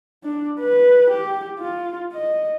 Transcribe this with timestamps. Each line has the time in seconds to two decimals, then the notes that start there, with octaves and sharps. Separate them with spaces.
0.24 D4
0.60 B4
1.10 G4
1.60 F4
2.13 D#5